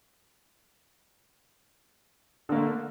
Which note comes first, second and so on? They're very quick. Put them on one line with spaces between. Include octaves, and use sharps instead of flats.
D3 A#3 A3